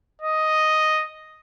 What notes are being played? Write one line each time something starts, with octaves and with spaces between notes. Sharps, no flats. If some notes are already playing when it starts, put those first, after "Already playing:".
D#5